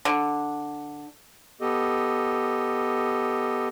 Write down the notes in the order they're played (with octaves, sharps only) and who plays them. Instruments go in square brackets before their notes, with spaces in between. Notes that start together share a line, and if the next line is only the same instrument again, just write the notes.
[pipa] D3
[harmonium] B3 G4 A4 D#5